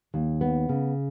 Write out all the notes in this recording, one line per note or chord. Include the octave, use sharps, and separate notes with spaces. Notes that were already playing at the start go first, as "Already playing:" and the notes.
D#2
B3
C#3